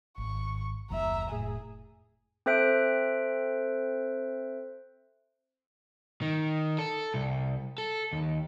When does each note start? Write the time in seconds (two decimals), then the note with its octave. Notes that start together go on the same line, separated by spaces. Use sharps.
0.18 G#1 C#6
0.90 F#1 D#2 F#3 E5 A#5
1.29 F1 A2 G#4
2.46 C4 A4 C5 E5 F#6 D7
6.22 D#3
6.79 A4
7.14 C2
7.78 A4
8.13 D#2